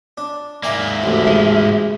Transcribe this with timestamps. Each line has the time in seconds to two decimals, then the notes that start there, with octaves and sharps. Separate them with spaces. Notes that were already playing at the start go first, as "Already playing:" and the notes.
0.18 D4
0.63 G#2 A#3 D5 E5 G#5 A#5
1.04 A1 D2
1.27 G#3